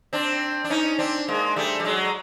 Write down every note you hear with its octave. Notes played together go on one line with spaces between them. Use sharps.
C4 D4
D4
C#4 D#4
C4 D4
G#3 A#3
G3 A3
G3
F#3 G#3